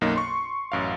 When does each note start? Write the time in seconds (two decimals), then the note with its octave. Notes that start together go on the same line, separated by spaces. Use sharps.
0.01 B1 F#2 A#3 D#4
0.16 C6 C#6
0.72 A1 F#2 F5